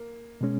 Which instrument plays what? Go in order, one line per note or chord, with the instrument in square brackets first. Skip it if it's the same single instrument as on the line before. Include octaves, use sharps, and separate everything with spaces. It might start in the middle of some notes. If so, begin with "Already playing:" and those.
Already playing: [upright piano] A#3
[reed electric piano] B2 G#3 C#4